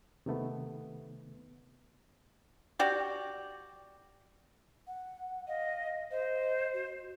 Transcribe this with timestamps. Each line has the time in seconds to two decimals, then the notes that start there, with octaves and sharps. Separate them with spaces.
0.26 C3 D#3 A3 B3
2.79 F#4 G4 D5
4.87 F#5
5.48 D#5 F5
6.11 C5 D#5
6.74 F#4